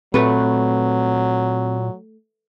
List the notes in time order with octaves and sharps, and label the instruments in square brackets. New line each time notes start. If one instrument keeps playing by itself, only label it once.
[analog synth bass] A#2 [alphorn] F#3 [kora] A3 B4 [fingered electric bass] C4